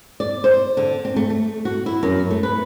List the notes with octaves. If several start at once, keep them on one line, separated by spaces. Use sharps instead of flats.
D5
C5
D3
C4
A3
A3
F#4
E4
F#2
A3
B4